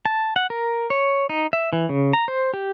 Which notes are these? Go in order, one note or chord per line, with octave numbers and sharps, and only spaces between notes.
A5
F#5
A#4
C#5
D#4
E5
E3
C#3
A#5
C5
G4